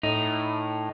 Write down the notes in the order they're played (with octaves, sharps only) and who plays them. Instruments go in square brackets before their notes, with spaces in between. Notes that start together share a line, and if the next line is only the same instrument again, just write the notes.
[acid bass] A2 [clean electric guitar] D#4